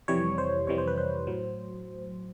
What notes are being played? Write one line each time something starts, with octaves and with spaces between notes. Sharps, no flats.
F2 C3 E3 G3 C#5
C5
F2 C3 E3 G3 C#5
C5
B4
C5
A2 F#3